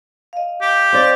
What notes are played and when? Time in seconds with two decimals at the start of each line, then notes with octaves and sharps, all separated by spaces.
0.33 D#5 F5
0.61 G4
0.93 C4 D5